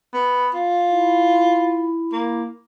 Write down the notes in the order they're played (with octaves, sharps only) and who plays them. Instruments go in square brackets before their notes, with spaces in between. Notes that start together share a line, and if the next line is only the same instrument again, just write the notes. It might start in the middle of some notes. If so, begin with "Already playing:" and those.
[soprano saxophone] B3
F4
[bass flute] E4
[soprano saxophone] A#3